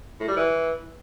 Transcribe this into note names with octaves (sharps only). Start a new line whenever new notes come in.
A2
G3
E3